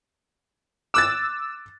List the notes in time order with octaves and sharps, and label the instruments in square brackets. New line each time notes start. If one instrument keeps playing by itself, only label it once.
[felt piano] D6 F#6 A6 [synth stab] E6